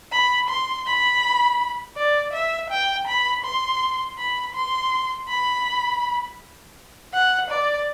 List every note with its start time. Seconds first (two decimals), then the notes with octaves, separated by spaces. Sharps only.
0.12 B5
0.49 C6
0.87 B5
1.97 D5
2.33 E5
2.70 G5
3.08 B5
3.45 C6
4.18 B5
4.55 C6
5.28 B5
7.13 F#5
7.51 D5